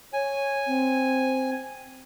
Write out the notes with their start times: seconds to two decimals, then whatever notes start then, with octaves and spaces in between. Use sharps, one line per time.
0.13 C#5 G#5
0.67 C4